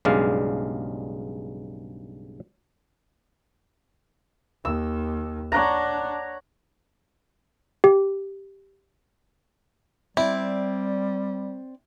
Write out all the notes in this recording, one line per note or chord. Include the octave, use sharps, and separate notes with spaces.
B1 G2 C#3 G#3 D5 F5
D#2 E6
D4 C#5 F#5 A#5
G4
G3 C4 E4 D5